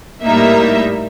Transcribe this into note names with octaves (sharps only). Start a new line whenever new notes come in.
A2 G3 A#3 D#4 E5